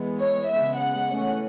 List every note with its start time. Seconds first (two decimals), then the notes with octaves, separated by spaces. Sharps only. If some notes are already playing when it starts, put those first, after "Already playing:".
Already playing: E3 G#3 B3
0.20 C#5
0.50 C#3 G#3 B3 E5
0.79 F#5
1.10 E3 A3 C#4